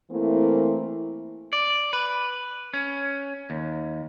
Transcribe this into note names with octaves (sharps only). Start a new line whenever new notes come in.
E3 A3 A#3 C4 E4
D5
B4
C#4
D#2